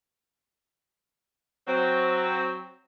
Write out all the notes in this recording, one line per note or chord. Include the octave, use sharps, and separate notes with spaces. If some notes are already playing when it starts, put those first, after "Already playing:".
F#3 C4